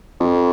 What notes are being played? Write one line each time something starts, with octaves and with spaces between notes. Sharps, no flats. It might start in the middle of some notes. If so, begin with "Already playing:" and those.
F2